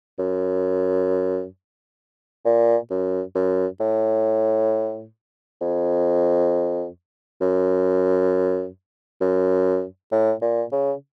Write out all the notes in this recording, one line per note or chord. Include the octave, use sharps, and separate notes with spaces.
F#2
A#2
F#2
F#2
A2
F2
F#2
F#2
A2
A#2
C#3